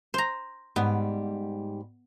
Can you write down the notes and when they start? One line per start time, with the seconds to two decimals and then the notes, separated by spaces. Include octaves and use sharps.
0.14 C5 A#5
0.76 G#2 G3 B3